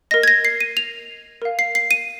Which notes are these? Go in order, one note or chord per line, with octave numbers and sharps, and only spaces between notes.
A#4 D#5 A#6
G#6
A#6
C7
D#7
F7
A#4 F5
C7
C7
D#7